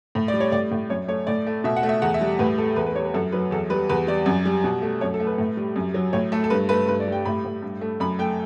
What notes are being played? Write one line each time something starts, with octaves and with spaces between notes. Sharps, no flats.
A2
D5
G3
C#5
A2 D5
A2
F#2 C#5
A3 C#5
A2 D5
A3
B2 E5
F#5
A3
E5
E2 F#5
E5
G3
A2 B4
A3 A4
E2 B4
B4
G3 C#5
B4
F#2 A4
F#3 B4
E2 A4
G3 B4
E2 B4
G3 D5
F#2
G3
B2
A3
F#2 C#5
A4
A3
B4
A2
G3
F#2
F#3
A2 C#5
A3 A4
A4
G2 B4
A3 B4
G2 B4
D5
G3
G5
A2 B5
A2
G2
A3
F#2 B5
A3 G5